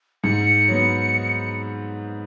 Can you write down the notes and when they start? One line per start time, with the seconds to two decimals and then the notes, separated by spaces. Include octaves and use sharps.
0.24 G#2 C#7
0.68 F#3 B3